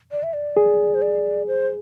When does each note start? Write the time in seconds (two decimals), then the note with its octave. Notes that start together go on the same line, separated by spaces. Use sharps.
0.11 D5
0.23 E5
0.33 D5
0.57 G#4
0.94 C5
1.02 D5
1.47 C5